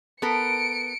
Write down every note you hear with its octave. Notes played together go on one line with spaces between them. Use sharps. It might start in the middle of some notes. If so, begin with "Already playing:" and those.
B3 A4 A#4 C#7 D7